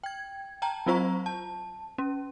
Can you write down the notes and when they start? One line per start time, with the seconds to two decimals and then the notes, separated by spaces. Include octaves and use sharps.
0.04 G5 G#6
0.62 G5 A5 A#5
0.86 F#3 C4 F4 C5 A#5 C#6
1.26 A5
1.98 C#4